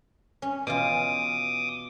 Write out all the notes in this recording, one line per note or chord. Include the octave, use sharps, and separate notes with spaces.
C#4
B2 E3 F4 D6 D#6